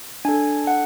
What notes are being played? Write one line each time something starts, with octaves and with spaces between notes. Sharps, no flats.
D4 A4 G#5
F#5